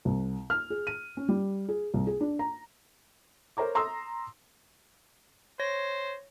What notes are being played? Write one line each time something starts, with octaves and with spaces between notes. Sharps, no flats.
C2
F6
G#4
D#7
C#4
G3
G#4
C2
G#4
D4
A#5
A#4 C5 C#5 A#5 D6
A#5 C6 D#6 E6
C5 C#5 A#6